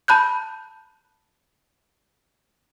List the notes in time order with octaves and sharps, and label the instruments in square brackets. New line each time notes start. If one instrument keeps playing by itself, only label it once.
[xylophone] A5 B5 F#6 G6